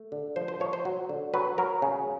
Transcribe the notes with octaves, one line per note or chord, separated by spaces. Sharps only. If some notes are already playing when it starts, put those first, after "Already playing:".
Already playing: A3
D3
F3 C5
C5
F3 C#5
C5
F#3
D3
F#3 B4
F#3 A#4
C#3